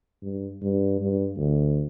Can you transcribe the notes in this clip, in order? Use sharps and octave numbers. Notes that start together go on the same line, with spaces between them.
G2
G2
G2
D2